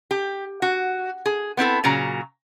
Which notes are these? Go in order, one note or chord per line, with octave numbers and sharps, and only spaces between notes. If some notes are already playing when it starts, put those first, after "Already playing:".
G4
F#4
G#4
B3 C4 E4 A4
A#2 C#3 F#3 A#5